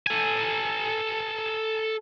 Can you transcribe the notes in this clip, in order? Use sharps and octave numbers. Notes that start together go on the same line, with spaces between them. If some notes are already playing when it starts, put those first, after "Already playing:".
A4 G#5